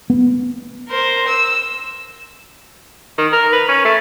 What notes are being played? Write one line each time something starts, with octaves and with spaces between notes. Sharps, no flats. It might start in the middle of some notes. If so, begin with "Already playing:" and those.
B3
A#4 C5
E6
D#3
A#4
B4
C#4
A3